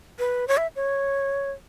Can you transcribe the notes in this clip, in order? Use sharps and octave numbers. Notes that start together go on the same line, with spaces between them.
B4
C#5
E5
C#5